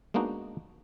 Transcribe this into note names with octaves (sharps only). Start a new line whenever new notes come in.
G#3 A#3 B3 D4 D#4 F#4